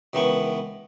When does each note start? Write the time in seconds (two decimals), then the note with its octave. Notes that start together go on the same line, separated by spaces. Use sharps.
0.13 C#2 D#3 E3 B3 G5 C#6